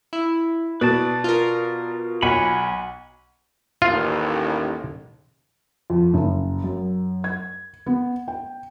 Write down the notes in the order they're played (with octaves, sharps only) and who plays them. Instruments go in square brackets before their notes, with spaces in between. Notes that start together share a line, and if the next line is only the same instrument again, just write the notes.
[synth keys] E4
[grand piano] B2 [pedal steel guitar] B4 D5 A5
[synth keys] F4 A#4
[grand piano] B1 [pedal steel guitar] F#5 G#5 B5
[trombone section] A1 D#2 [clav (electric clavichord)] F4
[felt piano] F2
F#1
F#2
G#6
B3
G5